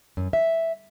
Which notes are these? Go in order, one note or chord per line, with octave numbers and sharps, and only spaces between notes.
F#2
E5